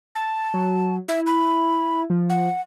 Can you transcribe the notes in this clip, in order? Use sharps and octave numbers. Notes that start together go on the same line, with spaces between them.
A5 A6
F#3
E4 E5
B5
F3
F#5